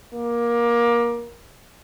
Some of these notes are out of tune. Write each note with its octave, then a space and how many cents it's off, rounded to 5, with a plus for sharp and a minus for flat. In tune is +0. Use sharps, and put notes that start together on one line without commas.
A#3 +20